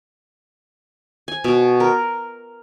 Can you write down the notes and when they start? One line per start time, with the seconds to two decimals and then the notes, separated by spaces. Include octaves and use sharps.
1.28 G#5
1.44 B2
1.80 A#4